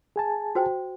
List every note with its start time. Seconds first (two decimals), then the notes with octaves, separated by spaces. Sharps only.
0.16 G#4 G#5 A5
0.55 F#4 C5 G5